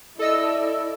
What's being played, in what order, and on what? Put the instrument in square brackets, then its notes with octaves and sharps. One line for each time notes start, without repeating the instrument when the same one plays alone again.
[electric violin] E4 D5 [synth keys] A4 D#5 E6